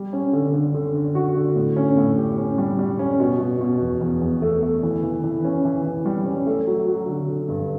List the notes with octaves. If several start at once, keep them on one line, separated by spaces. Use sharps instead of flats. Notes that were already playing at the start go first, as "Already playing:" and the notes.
Already playing: G3
C#4
D3
D3
D3
D3
F#4
D3
A2
C#4
A2
G4
C#4
G3
G3
C#4
B2
B2
B2
E2
E2
E2
A3
A3
E3
E3
E3
C#4
E3
E3
G3
C#4
A3
F#3
F#3
D3
D3
G2